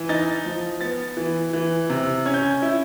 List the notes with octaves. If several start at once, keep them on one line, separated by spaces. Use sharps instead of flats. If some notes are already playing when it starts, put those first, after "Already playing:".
Already playing: E3
D#4 A6
F3
B3 A6
E3
E3
C3
C#4 G#6
G6
G#6
E4